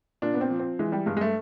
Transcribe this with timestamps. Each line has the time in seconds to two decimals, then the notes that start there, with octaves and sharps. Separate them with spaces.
0.22 A#2 D4
0.34 B3
0.41 C4
0.50 F3
0.60 C4
0.79 E3 G#3
0.92 G3
1.06 G2 G#3
1.17 G#3
1.21 A3